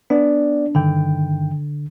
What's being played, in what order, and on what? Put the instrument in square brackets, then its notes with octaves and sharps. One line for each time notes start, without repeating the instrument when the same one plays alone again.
[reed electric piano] B3 D5 [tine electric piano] D4
[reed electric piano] G2 D#3 G5 [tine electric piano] D3